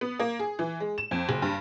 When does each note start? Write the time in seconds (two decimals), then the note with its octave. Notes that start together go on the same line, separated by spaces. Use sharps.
0.01 B3
0.20 A#3
0.39 G#4
0.59 E3
0.80 G#3
0.98 E7
1.11 F2
1.29 F#1
1.42 G2